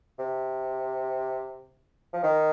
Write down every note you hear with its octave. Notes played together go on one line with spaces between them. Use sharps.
C3
F3
D#3